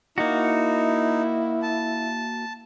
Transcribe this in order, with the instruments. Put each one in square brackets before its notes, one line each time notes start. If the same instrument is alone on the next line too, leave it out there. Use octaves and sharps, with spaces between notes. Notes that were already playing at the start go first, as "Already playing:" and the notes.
[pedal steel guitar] A#3 F#4 [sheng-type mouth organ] D#4 [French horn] E4
[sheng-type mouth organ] A5